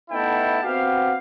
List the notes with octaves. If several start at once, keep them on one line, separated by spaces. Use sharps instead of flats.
A3 B3 D#4 E4 G5 A5
B3 C4 F#4 G4 F5